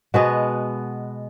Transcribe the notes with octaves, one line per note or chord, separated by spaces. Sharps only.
B2 G#3 B3 F#4